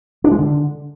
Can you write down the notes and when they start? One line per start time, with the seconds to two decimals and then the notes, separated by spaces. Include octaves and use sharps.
0.24 D4
0.31 G#3
0.39 D3